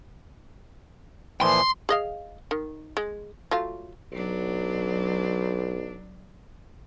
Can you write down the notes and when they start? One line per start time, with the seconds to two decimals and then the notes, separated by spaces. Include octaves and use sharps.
1.41 A#2 E3 F3 C6
1.89 G#4 D#5 F5
2.51 D#3
2.97 G#3
3.51 F#3 A3 F4
4.12 B1 F#3 D4